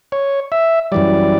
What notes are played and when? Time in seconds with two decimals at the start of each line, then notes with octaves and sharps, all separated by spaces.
0.12 C#5
0.52 E5
0.92 F#2 E3 G3 D5